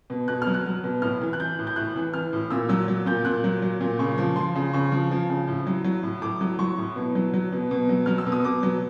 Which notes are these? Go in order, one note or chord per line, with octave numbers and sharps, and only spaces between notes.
B2
B2 F#6
F6
F#3
F#6
F#3
B2
A2 F6
E3
F#6
E3 G6
A2
G6
A2 F#6
E3
E3 F6
A2
A#2 E6
F#3 E6
F#3
A#2 G6
A#2 F#6
F#3
F#3
A#2
C#3 C#6
F3
F3 C6
C#3
C#3 C#6
F3
F3
C#3
A2
F#3
F#3
A2
A2 D6
F#3
F#3 C#6
A2
B2
F#3
F#3
B2
B2
F#3
F#3 F6
E6
B2
D#6
B2 D6
F#3